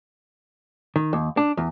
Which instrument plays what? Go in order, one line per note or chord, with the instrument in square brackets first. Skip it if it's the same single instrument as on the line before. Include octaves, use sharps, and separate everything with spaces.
[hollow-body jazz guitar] D#3
D#2
D4
E2